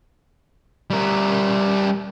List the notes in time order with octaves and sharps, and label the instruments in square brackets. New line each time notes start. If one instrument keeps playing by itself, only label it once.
[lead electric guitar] G3 A#4